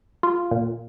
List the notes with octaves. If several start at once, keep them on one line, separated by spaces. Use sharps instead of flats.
F4
A#2